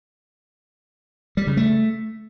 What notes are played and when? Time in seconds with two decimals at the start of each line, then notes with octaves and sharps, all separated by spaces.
1.37 G3
1.47 C#3
1.57 A3